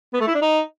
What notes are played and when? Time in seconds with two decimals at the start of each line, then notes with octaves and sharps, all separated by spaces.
0.14 B3
0.21 A3
0.28 E4
0.35 D4
0.42 D#4